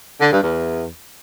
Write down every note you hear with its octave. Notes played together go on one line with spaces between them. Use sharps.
D3
G2
E2